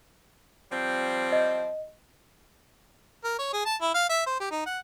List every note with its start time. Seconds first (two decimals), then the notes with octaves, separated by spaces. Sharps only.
0.72 F3 G3 C4
1.32 D#5
3.24 A#4
3.38 C#5
3.53 G#4
3.65 A5
3.81 E4
3.94 F5
4.09 E5
4.26 C5
4.40 G4
4.51 D#4
4.66 F#5